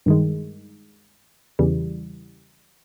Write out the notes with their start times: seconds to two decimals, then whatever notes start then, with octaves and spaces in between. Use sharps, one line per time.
0.06 G2 D#3 G#3
1.59 E2 C#3 E3 G3